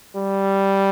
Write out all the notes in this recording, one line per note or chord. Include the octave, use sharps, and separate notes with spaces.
G3